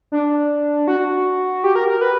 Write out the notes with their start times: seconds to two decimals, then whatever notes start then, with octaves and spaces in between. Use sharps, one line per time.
0.12 D4
0.88 F#4
1.64 G4
1.75 A#4
1.88 A#4
2.01 B4